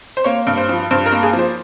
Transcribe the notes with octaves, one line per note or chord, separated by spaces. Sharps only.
C5
A#3 C#5
G2
C5
F3
G2 C5
A#4
A#3
G#4
F3
C5